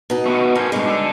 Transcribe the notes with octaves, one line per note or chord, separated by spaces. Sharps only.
B2 D#4
A3 B3 F#4
A3 A#4 C5 G#5
G2 B2 G#3 D#4
D4 G#4 A4